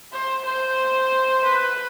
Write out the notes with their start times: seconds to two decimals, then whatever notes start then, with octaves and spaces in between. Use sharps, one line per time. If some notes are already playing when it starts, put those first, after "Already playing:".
0.12 C5
0.45 C5
1.44 B4